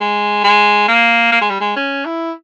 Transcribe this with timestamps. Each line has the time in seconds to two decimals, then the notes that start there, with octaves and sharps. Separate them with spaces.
0.01 G#3
0.44 G#3
0.88 A#3
1.32 A#3
1.41 G#3
1.50 G3
1.60 G#3
1.76 C#4
2.05 E4